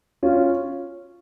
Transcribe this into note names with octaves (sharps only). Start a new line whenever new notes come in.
C#4 F4